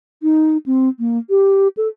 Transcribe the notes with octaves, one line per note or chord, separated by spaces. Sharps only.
D#4
C4
A#3
G4
A4